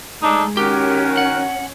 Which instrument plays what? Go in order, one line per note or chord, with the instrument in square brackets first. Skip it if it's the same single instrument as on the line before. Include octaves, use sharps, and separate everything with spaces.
[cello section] G#3 [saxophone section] A3 D4 D#4
[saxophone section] D#3 F#4 A#4 [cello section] C#4 [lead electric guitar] G4
[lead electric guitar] F#5